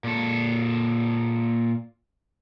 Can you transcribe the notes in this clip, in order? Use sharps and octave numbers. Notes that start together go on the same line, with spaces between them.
A#2 A4